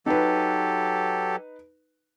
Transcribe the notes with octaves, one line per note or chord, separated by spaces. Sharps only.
F#3 D#4 G4 A4 B4